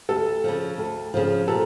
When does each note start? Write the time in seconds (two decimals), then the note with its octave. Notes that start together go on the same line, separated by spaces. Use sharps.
0.09 D2 A4
0.44 C#3 F3
0.78 D2
1.14 C#3 F3
1.48 A#2 A4